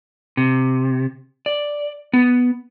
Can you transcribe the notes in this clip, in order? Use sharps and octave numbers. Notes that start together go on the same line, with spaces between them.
C3
D5
B3